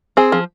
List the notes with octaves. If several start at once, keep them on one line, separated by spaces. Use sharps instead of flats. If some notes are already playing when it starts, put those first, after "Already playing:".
C4 G#4
F3